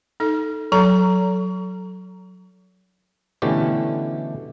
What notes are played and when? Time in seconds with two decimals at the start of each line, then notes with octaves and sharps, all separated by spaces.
0.20 D#4 A4
0.72 F#3 A4 A#5
3.42 B2 D3 E3 A3 C#4 G4